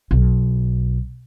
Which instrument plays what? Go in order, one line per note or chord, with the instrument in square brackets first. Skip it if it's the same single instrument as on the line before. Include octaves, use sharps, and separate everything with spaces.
[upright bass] B1